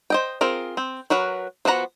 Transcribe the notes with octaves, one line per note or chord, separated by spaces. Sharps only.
C5 D#5 G5
C4 F4 G#4 A#4
C4
F#3 F#4 A#4 B4
F3 B3 F#4 F#5 A#5